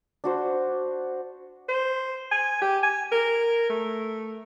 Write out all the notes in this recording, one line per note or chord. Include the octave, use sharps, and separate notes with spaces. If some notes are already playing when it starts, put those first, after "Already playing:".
D4 F#4 C5
C5
G#5
G4
G#5
A#4
A3